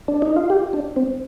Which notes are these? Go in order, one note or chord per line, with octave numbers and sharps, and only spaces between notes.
D4
D#4
F4
G4
D4
C4